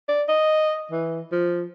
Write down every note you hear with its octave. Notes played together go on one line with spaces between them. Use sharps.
D5
D#5
E3
F3